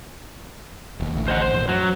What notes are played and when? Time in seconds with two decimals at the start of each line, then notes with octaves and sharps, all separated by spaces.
1.00 E1 D#2
1.14 A1 D2 A2
1.28 C5 D#5 F#5
1.41 C5
1.53 A#1 E2 A2
1.68 F#2 F#3